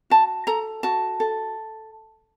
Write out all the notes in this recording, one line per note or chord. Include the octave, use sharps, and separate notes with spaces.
F#4 A5
A4 A#5
F#4 A5
A4